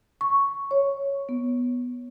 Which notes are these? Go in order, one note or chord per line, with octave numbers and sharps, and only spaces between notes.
C#6
C#5
B3